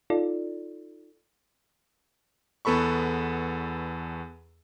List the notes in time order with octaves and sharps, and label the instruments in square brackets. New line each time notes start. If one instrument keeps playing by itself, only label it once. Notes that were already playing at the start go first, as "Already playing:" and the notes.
[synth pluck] D#4 F4 A4 D5
[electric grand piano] E2 B3 A4 B5 C#6